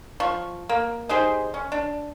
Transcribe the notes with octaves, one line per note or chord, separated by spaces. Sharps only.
F3 C#6
A#3
D#4 G4 G#4 C5
C#4
D4